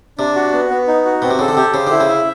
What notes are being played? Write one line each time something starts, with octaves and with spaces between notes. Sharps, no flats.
C3 D4
F#4
B3
B3
D#4
F#4
B2 C4
C3
C#3 A4
D3
C3 G4
C#3 C5
D3 E4
C#3
E5